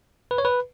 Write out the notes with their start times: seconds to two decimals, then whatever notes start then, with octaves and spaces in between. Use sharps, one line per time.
0.31 B4
0.38 C#5
0.45 B4